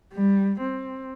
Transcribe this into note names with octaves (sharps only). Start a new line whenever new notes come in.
G3
C4